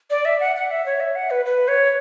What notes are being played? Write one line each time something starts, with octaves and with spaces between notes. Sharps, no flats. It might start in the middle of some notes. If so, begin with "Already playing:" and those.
D5
E5
F#5
F#5
E5
C#5
E5
F#5
B4
B4
C#5